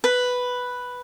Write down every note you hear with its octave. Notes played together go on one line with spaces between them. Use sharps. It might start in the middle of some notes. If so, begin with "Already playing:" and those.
B4